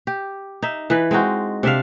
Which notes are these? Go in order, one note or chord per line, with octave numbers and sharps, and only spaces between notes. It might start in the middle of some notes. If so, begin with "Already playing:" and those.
G4
D#4 E5
E3 B4
G#3 C4 D#4 F#4
C3 D4 E5 F5